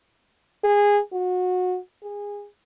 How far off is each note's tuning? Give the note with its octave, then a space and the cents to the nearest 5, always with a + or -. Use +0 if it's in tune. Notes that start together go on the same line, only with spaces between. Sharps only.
G#4 -20
F#4 -25
G#4 -25